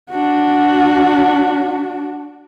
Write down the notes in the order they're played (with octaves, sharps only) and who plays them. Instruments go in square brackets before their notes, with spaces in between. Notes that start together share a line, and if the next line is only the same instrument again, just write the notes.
[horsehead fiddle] D4 F#4